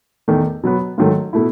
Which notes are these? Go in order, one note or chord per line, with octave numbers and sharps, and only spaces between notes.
E2 D#3 A3
B2 F#3 B3
G#2 D#3 F#3 A3
B2 A3 E4